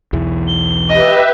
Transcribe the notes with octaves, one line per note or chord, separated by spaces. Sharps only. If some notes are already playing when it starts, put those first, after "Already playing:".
B1 E2 E3
G7
G4 B4 D#5 E5